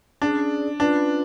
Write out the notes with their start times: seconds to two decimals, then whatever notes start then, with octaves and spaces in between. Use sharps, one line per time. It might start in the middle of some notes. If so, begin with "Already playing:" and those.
0.22 C#4 D4 G#4 D5
0.80 C#4 D4 F4 B4